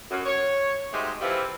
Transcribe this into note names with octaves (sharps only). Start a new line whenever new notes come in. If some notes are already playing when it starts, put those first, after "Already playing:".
F#2
C#5
F#3 G#3 A3 C4 D#4 G4
E3 F3 C4 E4 G4 A4